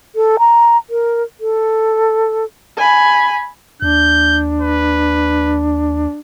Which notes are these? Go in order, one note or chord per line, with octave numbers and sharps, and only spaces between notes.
A4
A#5
A#4
A4
G#5 B5
D#2 D4 G6
B4